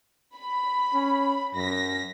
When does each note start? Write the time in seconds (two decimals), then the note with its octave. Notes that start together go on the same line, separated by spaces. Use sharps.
0.36 B5
0.93 C#4
1.55 F#2 A#6 B6